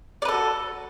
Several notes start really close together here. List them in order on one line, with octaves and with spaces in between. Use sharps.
D5 B4 A4 F#4